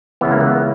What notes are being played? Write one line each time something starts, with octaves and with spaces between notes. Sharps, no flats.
C#2 C#3 E3 B3
A#3
B3